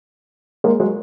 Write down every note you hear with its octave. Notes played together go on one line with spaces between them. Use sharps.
G#3 A#3
F#3 G#3